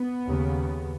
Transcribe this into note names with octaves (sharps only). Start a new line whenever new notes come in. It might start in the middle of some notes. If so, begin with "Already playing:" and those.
Already playing: B3
D#2 C#3